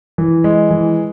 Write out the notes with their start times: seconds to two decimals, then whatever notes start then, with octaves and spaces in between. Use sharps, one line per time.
0.18 E3
0.44 G#3
0.70 E3